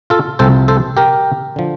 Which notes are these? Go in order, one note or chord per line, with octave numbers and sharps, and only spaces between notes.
F4 A4
C2 C3 F3 A4 C5
A4 C5
G4 A#4
D3 F3